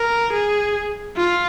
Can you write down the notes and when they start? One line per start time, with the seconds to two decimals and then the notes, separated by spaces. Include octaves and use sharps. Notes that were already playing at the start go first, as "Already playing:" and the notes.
Already playing: A#4
0.33 G#4
1.17 F4